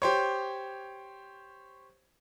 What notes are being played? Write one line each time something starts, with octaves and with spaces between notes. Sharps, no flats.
G4 C5 C#5